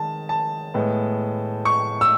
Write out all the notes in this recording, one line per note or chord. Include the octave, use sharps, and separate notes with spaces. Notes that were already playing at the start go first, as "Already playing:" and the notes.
Already playing: D#3 G#3 A5
A5
A2 G#3 B3
C#6
E6